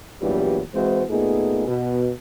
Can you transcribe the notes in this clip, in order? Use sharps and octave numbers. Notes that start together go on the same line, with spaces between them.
E2 G2 A#2 E3 F#3 G3
E3 G#3 C4 E4 F#4 C5
A#2 A3 B3 D#4 G#4
B2